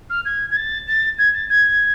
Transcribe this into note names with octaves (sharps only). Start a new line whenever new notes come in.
F6
G#6
G#6
A6
A6
G#6
A6
G#6